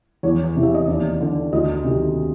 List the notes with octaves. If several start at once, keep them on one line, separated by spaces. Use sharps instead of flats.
E2 C#5
C3 E3
E5
D#5
D#2 D5
D3
D2 D#5
C3 D#3